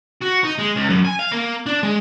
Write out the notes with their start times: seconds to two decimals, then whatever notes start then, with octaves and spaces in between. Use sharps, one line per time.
0.22 F#4
0.44 D#4
0.59 G#3
0.76 C#2
0.90 F#2
1.05 G#5
1.19 F5
1.32 A#3
1.66 D4
1.83 G#3